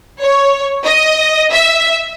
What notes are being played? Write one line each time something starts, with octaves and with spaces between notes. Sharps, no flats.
C#5
D#5
E5